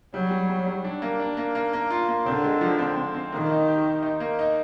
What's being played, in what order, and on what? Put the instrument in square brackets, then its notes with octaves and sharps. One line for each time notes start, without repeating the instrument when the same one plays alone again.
[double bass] F#3 [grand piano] G3
[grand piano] G3
G3
G3
D4
A#3
D4
A#3
A#3
A#3
F4
A#3
[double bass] D3 [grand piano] C4
[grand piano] G#3
F3
C4
C4
C4
[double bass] D#3 [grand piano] A#3
[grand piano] D#4
G4
D#4
D#4
A#3
D#4